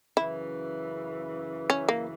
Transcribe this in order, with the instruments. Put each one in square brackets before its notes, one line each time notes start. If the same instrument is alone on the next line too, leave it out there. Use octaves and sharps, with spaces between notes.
[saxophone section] F#2 C#3 E3 [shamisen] E4
[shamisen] C#4
A#3